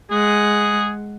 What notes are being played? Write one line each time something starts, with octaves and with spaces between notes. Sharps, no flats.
G#3 G#4 F#5